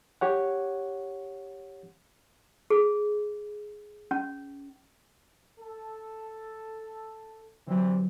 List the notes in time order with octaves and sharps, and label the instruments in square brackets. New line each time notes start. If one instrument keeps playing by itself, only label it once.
[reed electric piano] G4 C#5 F#5
[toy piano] G#4
C#4
[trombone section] A4
[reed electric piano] D3 F#3 [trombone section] E3 G3 C4